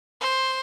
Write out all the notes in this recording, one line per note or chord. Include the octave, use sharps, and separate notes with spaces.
C5